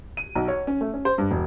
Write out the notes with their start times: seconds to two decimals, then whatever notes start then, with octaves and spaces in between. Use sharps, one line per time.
0.17 D#7
0.35 B1
0.48 C#5
0.67 C#4
0.81 A3
0.94 C#4
1.05 C5
1.18 G2
1.31 E1